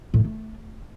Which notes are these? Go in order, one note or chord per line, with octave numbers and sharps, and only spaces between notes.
A2
D#3
A3